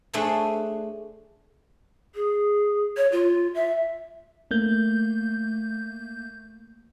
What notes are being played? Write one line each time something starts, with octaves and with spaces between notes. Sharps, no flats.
A3 D4 G#4 C5 C#5 E5
G#4
C#5
F4
E5
A3 A#3 G6